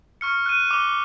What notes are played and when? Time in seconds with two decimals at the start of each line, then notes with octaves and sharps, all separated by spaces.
0.21 C#6 F6 C#7
0.46 F#6 D#7
0.71 D6 G7